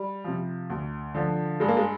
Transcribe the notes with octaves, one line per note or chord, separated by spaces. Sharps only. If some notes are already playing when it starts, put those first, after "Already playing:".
Already playing: G3
C3 F3
D2
D3 F3
G2 G#3
A#3
G#3